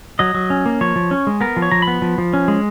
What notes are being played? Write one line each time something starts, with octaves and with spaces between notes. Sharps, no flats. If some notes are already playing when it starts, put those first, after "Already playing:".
F#3 D#5
F#3
C#4
A#3
F3 C#5
F3
C#4
G#3
B3 A#4
F3
C#5
F3 A#5
B5
B3
F3
F3
C#4
G#3